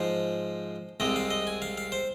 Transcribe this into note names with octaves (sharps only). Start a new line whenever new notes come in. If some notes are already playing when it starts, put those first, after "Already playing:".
Already playing: G#2 F3 G#3 C5
C2 C3 G#3 D#5
F5
D#5
G#5
F5
F5
C5